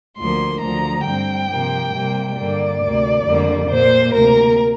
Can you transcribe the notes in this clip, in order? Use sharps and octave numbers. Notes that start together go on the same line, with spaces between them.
D2 D3 F3 A#3 C6
D2 D3 F3 A#5
G2 G3 C4 G5
C3 F3 A#3
C3 G3 A#3
G2 D3 A#3 D5
D2 C3 A#3
F2 D3 G3 A#3
A#2 A#3 C5
D2 C3 A#3 A#4